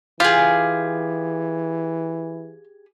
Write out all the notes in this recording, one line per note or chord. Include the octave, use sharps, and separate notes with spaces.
E3 F4 G4 G#4